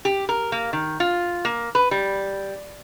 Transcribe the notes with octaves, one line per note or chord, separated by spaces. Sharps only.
G4
A#4
A#3
D#3
F4
A#3
B4
G3